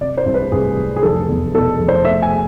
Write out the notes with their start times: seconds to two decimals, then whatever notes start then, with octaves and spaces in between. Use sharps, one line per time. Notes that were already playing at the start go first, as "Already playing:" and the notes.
0.01 C3 D5
0.17 C5
0.26 C2
0.34 B4
0.52 C2 G#4
0.77 C2
0.96 G#4
1.03 F1 A4
1.29 E2
1.54 B2 A4
1.79 F1
1.88 C5
2.05 A3 E5
2.22 G#5